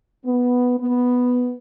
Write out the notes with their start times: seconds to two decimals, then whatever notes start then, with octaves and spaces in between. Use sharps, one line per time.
0.25 B3
0.78 B3